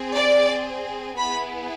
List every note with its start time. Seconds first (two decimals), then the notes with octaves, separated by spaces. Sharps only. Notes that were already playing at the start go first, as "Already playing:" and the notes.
Already playing: C4 G#4
0.15 D5
1.18 B3 E4 G#4 B5